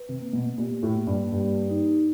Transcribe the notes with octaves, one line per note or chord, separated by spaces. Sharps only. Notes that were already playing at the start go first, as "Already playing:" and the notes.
Already playing: B4
C3
A#3
B2
A#2 G4
A2
A#3
G2
G2 G4
D#4